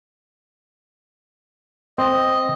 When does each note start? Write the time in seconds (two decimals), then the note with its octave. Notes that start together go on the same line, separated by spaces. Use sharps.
1.98 C4 D#5